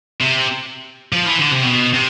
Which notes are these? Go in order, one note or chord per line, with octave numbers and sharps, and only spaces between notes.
C3
F3
E3
D3
C3
B2
C3